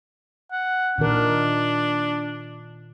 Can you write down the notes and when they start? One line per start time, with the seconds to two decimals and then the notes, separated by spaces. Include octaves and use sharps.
0.52 F#5
0.98 A#2 D#3 D4 A#4